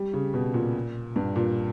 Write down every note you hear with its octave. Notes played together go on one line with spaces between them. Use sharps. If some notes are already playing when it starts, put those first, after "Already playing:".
Already playing: G3
C#3
B2
A#2
G2
A#2